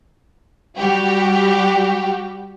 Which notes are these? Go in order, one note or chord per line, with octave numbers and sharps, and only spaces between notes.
G3 F#4 G4